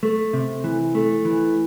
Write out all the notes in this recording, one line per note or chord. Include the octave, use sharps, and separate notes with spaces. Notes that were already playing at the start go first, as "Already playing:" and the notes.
A3
C3
E3
A3
E3